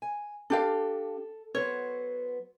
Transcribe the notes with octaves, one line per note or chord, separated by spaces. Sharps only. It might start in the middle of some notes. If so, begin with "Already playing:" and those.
G#5
D4 G4 A4 F5
F#3 B3 C5 C#5